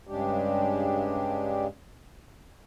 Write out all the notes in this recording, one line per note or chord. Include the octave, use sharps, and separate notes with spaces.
G2 C#3 G#3 D4 G4